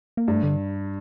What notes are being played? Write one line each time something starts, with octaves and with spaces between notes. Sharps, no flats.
A#3
G2 A3
D3